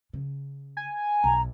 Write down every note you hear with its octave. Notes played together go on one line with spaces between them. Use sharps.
C#3
G#5
B1 A#5